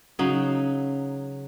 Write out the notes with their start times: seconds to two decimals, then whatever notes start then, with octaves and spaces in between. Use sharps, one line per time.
0.19 C#3 F#3 D#4